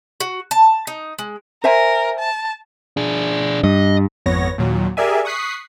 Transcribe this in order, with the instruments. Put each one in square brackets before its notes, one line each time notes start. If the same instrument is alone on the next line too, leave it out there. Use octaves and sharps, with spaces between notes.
[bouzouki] F#4
A5
D#4
G#3
[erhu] A#4 [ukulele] C5 E5 G#5
[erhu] A5
[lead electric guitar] D4 G#4
[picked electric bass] G2 [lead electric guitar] D#5
[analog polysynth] G#1 F2 B3 C#5 A#6
D#2 A#2 F#3
G4 G#4 A#4 D5 E5 G#5
C#6 D#6 F#6 B6 C7